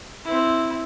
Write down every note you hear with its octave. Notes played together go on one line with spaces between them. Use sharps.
C4 E4